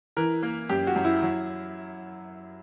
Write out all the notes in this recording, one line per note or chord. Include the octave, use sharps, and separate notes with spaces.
E3 A#4
A#3
F#2 G4
F#4
F#2
E4
F#3